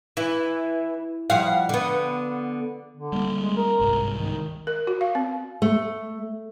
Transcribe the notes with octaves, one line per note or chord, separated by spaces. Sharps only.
E3 E4
F3 G3 F5 F#5
D3 B3
D3
G3 A#3
G#3
A#4
G1 C2 G#2
D#3
A#4
F#4
F5
C4
A3